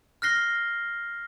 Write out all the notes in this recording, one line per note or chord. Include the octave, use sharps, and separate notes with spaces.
F6 F#6 A#6 C7 G7